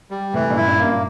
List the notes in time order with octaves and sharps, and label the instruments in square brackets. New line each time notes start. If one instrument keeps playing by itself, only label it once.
[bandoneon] G3
[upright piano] A2 C3 [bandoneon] E3
[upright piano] G2 A#2
[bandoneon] E4
[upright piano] G2 A#2
[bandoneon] A#3
[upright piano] G2 A#2